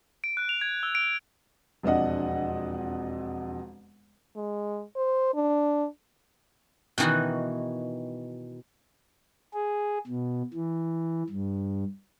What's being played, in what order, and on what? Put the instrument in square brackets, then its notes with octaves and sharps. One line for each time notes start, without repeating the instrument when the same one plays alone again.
[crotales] D7
F#6
F7
G#6
E6
D7
[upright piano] E1 F2 D4 D#5 F#5
[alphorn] G#3
C5
D4
[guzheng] B2 D#3 E3 D#4 F#4
[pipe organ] G#4
B2
E3
G2